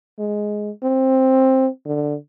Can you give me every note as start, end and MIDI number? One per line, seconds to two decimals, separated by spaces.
0.19 0.70 56
0.83 1.68 60
1.86 2.15 50